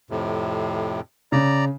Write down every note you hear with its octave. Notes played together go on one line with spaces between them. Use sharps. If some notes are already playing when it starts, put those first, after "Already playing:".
F2 A2 C3
C#3 D5 A#5